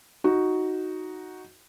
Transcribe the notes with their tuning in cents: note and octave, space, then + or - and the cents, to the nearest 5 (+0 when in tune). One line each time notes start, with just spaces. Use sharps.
D#4 +5 F#4 +0